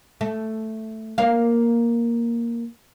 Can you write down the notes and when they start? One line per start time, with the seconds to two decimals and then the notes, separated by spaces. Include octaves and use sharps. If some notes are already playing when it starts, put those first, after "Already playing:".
0.21 A3
1.18 A#3 F5